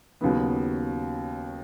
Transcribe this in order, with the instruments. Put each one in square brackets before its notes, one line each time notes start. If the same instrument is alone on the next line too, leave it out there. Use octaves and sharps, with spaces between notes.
[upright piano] D#2 C#3 F#3 B3